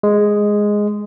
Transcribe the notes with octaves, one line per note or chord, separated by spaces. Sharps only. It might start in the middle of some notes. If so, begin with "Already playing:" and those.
G#3